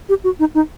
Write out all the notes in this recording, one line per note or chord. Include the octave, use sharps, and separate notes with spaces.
G4
F#4
D#4
D#4